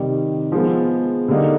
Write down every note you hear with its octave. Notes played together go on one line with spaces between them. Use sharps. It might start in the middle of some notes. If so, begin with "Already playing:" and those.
Already playing: C3 D#3 G3
F3 G#3 B3
D3 G3 A#3 D#4